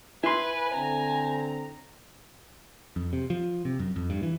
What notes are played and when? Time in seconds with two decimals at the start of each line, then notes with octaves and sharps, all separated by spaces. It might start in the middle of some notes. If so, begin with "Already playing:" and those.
0.24 E4 B4 G#5 C6
0.75 D3 C4 A#5
2.96 F2
3.13 C3
3.30 F3
3.65 C3
3.79 F#2
3.96 F2
4.10 G2
4.23 E3